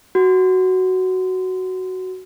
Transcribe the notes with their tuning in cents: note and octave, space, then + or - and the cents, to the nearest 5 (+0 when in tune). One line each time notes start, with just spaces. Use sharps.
F#4 +10